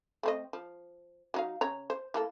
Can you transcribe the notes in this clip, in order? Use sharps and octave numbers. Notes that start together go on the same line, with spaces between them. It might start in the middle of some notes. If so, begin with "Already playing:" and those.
A3 C4 D#5
F3
F#3 D#4 F5
C#3 C#5 A#5
C5
E3 A#3 A4